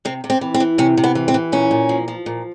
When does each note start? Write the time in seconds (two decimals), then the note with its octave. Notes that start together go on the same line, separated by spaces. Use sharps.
0.05 C3 C4
0.24 C3
0.30 C4
0.41 E3
0.54 C4
0.60 E3
0.78 C3 C#4
0.97 C3
1.04 B3
1.15 E3
1.28 C4
1.34 E3
1.52 A#2 C#4
1.71 A#2
1.89 F3
2.08 F3
2.26 A#2